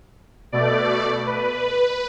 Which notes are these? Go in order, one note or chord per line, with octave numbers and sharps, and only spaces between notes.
B2 A3 D5
B4